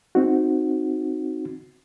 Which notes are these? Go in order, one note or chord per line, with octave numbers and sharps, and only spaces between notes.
C4 D#4 F#4